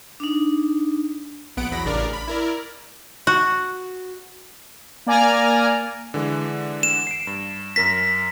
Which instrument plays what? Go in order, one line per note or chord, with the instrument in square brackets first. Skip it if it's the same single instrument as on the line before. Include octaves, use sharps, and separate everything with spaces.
[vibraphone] D4 D#4
[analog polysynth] A#1 B3 F#5 D7
E2 F#3 B5 A#6
A1 C#3 D4 A#4 D5
B5
E4 A#4 D5
[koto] F#4
[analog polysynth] A#3 D5 G#5 A#5 F6
[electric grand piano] D3 E3 G#3
[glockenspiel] E7
[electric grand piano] C7 D7
G2
[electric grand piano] F#2 A#4 A#6 [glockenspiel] B6